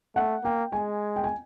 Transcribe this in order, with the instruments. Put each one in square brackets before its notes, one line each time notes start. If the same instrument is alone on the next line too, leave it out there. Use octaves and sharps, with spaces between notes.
[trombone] A3 [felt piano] F#5
[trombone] A#3 [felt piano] G5
[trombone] G#3 [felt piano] G#5
[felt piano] G5
G#5